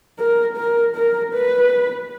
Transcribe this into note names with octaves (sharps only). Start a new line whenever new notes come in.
A#4
A#4
A#4
B4